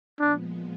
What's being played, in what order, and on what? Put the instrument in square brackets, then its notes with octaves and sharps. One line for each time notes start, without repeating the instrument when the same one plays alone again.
[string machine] A#2 F3 G#3 B3 [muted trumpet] D4